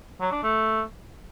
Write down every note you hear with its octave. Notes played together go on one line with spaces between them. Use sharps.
F#3
D4
A3